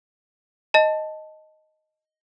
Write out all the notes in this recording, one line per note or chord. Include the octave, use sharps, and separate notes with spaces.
D#5 A5